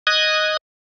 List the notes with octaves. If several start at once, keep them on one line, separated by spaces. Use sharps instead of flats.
D#5 D#6 F#6 G#6